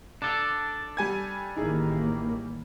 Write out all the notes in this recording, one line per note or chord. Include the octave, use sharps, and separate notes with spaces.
D4 A4 D6
G3 G#5 G#6
A1 D#3 A#3 D#4 E4 G#4